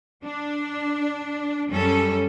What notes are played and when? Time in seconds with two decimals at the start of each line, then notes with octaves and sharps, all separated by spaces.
0.24 D4
1.71 F#2 G3 C#4 A4